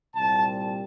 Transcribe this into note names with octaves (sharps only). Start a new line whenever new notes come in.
C2 A#2 G3 C4 A5